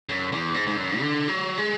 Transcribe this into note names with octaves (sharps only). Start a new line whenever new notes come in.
F#2
E2
G#2
G#2
F#2
D3
F#3
G#3